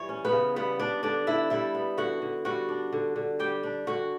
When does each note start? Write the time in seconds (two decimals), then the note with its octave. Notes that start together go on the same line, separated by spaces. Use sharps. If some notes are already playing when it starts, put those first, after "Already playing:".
Already playing: E3 G3 C#5
0.09 C#4
0.25 B3 B4
0.32 C#3
0.56 G3 B3 B4
0.79 B3 D4 D5
1.03 D3 D4 D5
1.27 D3 E4 E5
1.50 G3 E4 E5
1.75 B3
1.97 D3 F#4 F#5
2.22 D3
2.45 G3 F#4 F#5
2.69 D4
2.93 D3
3.16 D3
3.39 G3 G4 G5
3.63 D4
3.87 D3 F#4 F#5